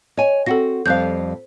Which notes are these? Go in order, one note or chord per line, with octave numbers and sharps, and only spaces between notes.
C#5 D#5 G#5
C4 F#4 A4 F#5 A#6
F2 G3 C5 F5 F#6 G6